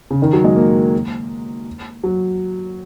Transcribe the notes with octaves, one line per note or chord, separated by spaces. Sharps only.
C#3
D#3
F#3
G#3
A#3
F#3